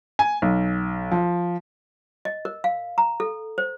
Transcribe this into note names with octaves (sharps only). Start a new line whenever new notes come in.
G#5
B1
F3
D#5
A#4
F5
A#5
A4
C5